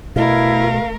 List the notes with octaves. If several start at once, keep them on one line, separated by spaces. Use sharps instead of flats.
B2 A3 E4 A#4 F5